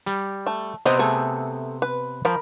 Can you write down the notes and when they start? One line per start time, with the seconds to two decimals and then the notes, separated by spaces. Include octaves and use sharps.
0.06 G3
0.47 A3
0.86 C3 B3 C4 C5 D#5
0.99 A3 G#4 A4
1.82 B4
2.25 F3 A#4 B5